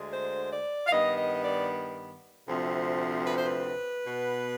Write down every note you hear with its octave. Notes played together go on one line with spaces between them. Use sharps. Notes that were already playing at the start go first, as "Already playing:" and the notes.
Already playing: D2 D3 G#3
C5
D5
F5
G2 D#3 B3 D#5
D#5
D#5
D5
D2 C3 F3 C4
B4
C5
B4
B2 B3